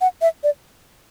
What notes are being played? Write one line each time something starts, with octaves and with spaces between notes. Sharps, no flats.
F#5
E5
D5